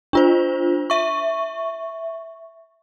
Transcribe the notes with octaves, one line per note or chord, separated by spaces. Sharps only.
D4 F4 C5
E5 C#6